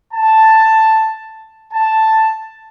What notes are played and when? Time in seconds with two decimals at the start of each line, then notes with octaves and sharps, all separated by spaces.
0.14 A5
1.74 A5